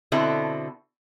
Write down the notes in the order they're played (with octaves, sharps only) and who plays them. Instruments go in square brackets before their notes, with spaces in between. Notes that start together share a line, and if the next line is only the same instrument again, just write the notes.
[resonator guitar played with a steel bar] B2 D3 B3 C4 E4 A4